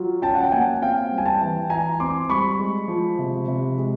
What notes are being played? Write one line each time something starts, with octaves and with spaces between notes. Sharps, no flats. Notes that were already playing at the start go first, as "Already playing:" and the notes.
Already playing: F#3 F4
C#4 G5 A5
F#5
G5
A#3 F#5 G#5
C4 F5 G5
G3
G#5
G5 A5
E3
E3 G#5 A#5
C4 C6 D6
G3 B5 C#6
G#3
F3
C3
C3
G#3